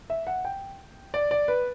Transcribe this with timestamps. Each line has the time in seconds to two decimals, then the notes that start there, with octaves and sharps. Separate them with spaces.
0.10 E5
0.27 F#5
0.45 G5
1.14 D5
1.31 D5
1.48 B4